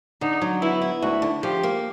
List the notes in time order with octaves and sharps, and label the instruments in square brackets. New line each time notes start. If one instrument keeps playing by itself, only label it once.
[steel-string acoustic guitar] D3 [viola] D#4
[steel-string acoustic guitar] F#3
[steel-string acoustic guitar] B3 [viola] E4
[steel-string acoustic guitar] E4
[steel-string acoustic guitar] D2 [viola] F#4
[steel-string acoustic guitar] D3
[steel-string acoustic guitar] F3 [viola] G4
[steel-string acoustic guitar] A#3